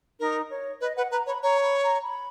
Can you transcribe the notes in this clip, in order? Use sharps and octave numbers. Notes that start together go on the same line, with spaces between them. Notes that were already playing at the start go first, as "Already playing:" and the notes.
D#4 A#4
C#5
B4 D#5
B4 F#5
B4 A#5
C#5 B5
C#5 A#5
B5
A#5
B5